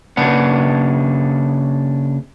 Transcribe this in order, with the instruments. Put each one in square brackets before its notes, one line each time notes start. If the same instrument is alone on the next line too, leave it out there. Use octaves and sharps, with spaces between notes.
[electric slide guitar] C#3 A#3 D4 B4 F#5